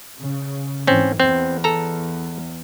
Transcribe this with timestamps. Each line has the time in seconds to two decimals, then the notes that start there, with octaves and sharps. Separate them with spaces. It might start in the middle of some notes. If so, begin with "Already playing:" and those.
0.18 C#3
0.87 G#2 E3 C4 C#4
1.20 E2 C4
1.64 A4 A#5